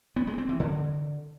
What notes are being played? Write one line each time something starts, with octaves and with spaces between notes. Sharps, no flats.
B3
G#3
C4
E3
D3